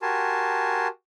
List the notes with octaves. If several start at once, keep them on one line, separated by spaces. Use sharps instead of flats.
F#4 G4 A#4 G#5 A5 C6